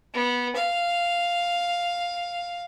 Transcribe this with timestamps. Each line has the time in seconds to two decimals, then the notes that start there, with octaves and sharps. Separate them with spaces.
0.13 B3
0.55 F5